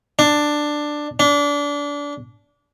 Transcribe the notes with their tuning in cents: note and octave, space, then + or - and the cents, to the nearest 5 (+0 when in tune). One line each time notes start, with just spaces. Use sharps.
D4 +10
D4 -25